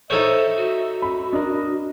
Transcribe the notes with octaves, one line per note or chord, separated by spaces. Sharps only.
D#4 A4 C5 C#5 E5
F#4
B5
D4 A#4 D#5